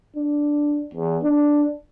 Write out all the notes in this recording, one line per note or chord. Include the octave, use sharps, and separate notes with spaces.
D4
E2
D4